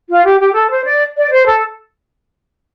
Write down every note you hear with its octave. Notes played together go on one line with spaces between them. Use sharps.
F4
G4
G4
A4
C5
D5
D5
C5
A4